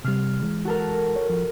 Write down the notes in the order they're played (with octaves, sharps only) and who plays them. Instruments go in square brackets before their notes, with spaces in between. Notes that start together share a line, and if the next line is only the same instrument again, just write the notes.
[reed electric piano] C3 G3 [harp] F6 C7
[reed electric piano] E3 G#3
[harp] F#4 A4 A#4
[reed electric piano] C#5
F3